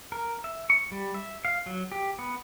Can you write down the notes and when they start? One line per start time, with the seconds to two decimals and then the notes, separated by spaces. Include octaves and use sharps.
0.12 A#4
0.44 E5
0.70 C#6
0.91 G3
1.14 E5
1.45 F5
1.66 F#3
1.92 G4
2.19 B3